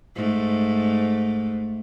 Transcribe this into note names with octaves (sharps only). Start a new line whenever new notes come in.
G#2 A3